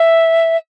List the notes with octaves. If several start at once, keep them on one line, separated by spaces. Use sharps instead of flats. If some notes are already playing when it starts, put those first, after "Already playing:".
Already playing: E5